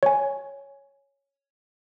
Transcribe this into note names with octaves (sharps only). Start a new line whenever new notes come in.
C#5 G#5